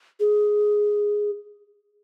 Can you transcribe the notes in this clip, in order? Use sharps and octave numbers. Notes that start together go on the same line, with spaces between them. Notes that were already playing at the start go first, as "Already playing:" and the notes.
G#4